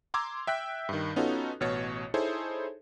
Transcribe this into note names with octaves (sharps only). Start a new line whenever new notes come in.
A#5 C6 D6 E6 G#6
E5 G5 F#6 B6
G2 D#3
B3 C#4 D#4 F4 F#4 A4
A1 B2 F#4 C#5 A6 C#7
D#4 E4 G#4 A4 C5 C#5